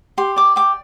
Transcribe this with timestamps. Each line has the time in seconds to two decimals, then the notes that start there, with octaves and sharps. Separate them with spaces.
0.18 G4 C6
0.36 D5 D6
0.56 G4 D6